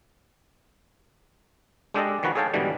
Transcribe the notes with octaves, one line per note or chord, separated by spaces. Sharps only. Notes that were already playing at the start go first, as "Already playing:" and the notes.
G#3 D4 G4 A4 D5 D#5
D#3 F3 F#4 B4
G#4 A4 C#5 F5 G5 A5
G#2 B2 D3 E3 G3